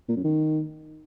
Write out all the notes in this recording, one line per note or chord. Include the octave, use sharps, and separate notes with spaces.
A#2
F#2
D#3